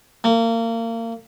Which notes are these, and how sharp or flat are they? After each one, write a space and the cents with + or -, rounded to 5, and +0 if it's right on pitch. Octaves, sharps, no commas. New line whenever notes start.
A#3 -30